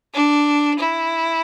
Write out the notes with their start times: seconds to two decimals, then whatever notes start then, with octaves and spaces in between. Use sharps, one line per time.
0.14 D4
0.79 E4